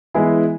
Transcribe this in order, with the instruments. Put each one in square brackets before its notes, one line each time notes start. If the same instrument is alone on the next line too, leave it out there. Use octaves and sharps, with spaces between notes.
[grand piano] E3 G#3 B3 E4 G#4